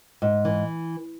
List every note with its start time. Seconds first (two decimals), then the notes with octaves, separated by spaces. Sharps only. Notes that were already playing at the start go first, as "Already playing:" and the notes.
0.22 G#2
0.45 E3